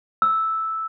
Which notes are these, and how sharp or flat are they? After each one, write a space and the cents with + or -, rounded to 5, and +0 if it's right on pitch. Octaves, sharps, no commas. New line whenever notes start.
E6 -5